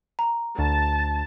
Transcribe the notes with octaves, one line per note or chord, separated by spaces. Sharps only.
A#5
D2 A5